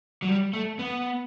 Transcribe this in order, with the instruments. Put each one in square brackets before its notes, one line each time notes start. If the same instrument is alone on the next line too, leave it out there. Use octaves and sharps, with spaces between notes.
[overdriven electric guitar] F#3
G3
A3
B3